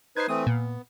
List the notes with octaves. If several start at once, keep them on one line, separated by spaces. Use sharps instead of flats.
D#4 B4 C5 G#6 C7
E3 A3 C4 D#6
A#2 B3